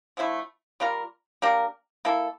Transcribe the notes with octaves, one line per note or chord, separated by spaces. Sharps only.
D3 F3 A3 E4
G3 A#3 F4 A#4
A#3 D4 G4 A#4
A#3 E4 A4